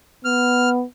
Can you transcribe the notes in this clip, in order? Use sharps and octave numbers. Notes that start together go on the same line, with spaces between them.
B3 F6